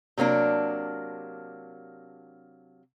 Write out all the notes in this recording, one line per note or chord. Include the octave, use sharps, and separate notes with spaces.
C3 F#3 A#3 D4